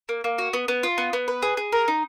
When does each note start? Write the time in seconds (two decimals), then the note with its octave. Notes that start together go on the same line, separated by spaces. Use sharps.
0.09 A#3
0.24 A#3
0.38 F#4
0.53 B3
0.68 B3
0.83 F4
0.98 B3
1.13 B3
1.28 B4
1.42 G#4
1.57 G#4
1.72 A#4
1.88 D#4